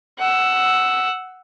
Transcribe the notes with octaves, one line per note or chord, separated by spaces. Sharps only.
F#5 E6